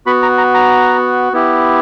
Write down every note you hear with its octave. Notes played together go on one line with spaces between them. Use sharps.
B3 F#4 B5
A#5
A#5
A#5
B3 E4 G4